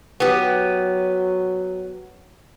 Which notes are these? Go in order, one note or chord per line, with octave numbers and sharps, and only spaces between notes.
F#3 B3 G4